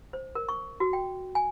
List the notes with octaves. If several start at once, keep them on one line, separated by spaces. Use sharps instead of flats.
C5
A#4
C#6
F#4
G5
G#5